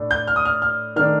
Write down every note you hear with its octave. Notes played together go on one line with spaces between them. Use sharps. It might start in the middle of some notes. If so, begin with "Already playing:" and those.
Already playing: A2 A3 D4
G6
F6
D#6
F6
F6
D#3 A3 D4 F6